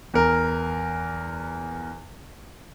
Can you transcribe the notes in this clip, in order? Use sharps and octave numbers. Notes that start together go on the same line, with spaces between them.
E2 A#4